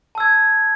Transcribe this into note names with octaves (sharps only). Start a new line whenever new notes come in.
A5 E6 G#6